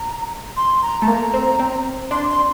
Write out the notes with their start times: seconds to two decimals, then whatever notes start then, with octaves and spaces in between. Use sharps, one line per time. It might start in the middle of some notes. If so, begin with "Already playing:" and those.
Already playing: A#5
0.57 C6
0.82 A#5
1.01 A3 A5
1.08 A#3 A#5
1.34 C4
1.59 C4
2.11 D4 C6
2.29 C6